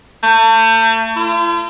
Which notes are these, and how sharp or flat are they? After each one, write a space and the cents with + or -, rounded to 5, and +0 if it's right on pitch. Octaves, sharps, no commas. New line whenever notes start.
A3 +35
F4 -45